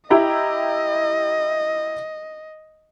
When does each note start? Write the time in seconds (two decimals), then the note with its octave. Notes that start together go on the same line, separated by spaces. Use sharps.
0.10 E4 G4 D#5 A#5